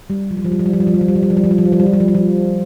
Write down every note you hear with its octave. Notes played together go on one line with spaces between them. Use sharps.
G3
F3
G3
F3
G3
F3
G3
F3
G3
F3
G3
F3
G3
F3
G3
F3
G3
F3
G3
F3
G3
F3
G3
F3
G3
F3
G3
F3